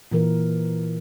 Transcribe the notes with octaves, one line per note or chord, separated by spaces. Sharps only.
A#2 E3 A#4